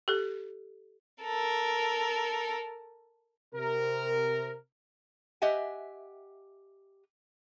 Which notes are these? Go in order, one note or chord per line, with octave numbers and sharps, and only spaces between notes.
G4 A4
A4 A#4
C3 A#4
G4 D#5 E5 F#5 G#5